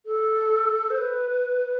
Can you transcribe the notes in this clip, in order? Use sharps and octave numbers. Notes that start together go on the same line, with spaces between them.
A4
C5
B4